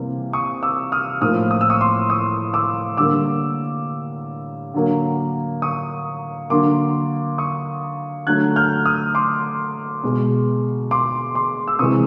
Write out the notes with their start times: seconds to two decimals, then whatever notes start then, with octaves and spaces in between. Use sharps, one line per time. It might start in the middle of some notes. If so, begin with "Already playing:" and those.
Already playing: C3 E3 G3 A#3
0.33 C#6 D#6
0.63 D6 E6
0.92 D#6 F6
1.21 A2 F3 A#3 D#6 F6
1.51 D#6
1.61 E6
1.70 C#6 D#6
1.80 C6 D6
2.10 C#6 D#6
2.54 D6 E6
2.97 D3 G3 A#3 D6 E6
4.74 D3 F#3 A#3
5.62 C#6 D#6
6.50 D3 F#3 A#3 C6 D6
7.38 C#6 D#6
8.27 D3 F#3 A3 F#6 G#6
8.56 F6 G6
8.85 D#6 F6
9.15 C6 D6
10.04 B2 G#3
10.91 C6 D6
11.35 C6 D6
11.68 E6
11.79 C3 E3 G#3 C#6 D#6